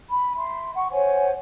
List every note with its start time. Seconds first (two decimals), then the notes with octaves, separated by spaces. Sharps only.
0.10 B5
0.36 E5 C6
0.75 F#5 C#6
0.91 C5 C#5 F#5 G#5